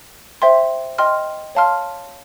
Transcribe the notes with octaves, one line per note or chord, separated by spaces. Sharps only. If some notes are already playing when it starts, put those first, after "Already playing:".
C5 E5 G5 C6
D#5 G5 C6 F6
C#5 F5 A5 C6 F6